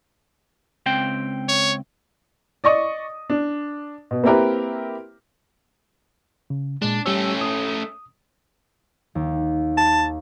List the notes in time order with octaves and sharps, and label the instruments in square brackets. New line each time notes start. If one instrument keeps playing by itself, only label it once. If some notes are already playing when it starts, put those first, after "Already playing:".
[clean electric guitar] C#2 C4 G5
[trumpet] C#5
[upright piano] D5 D#5 C#6 D#6
D4
B2
A#3 C4 E4 G4 A#4 B4
[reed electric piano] C#3
[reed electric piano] A#2 G#3 [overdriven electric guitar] D4
[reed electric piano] G3 G4 E6 [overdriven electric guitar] A3 C#4
[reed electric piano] D#6
[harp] D#2
[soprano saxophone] A5